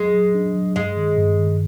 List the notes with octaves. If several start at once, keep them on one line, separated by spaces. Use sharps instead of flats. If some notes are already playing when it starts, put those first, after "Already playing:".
Already playing: F#3 G#3
F#3
D4
F#3
G2 G#3
D#3
G2
D#3